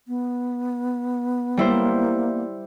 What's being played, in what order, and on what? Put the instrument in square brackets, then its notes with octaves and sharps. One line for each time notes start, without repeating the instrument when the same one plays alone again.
[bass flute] B3
[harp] G3 E4 C5 [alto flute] A#3